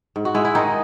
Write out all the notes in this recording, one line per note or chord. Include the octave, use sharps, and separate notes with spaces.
G#2
F#4
G#3 E4
E4
D#3 D#4